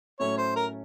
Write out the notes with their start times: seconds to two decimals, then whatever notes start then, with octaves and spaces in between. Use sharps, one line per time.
0.20 A2 F#3 A3 C#4 A4 C#5
0.38 C5
0.56 A#4